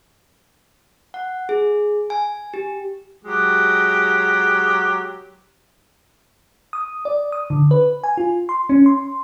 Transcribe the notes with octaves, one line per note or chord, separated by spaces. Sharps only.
F#5
G#4
G#5
G4
F#3 G#3 G4
D#6
D5
D#6
D3
B4
G#5
F4
C6
C#4
C6